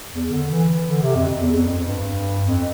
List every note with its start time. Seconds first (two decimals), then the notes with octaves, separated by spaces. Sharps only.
0.12 E2
0.31 D3
0.51 E3
0.90 D3
1.02 C3
1.16 F2
1.41 E2
1.55 F2
1.68 F2
1.87 G2
2.45 F2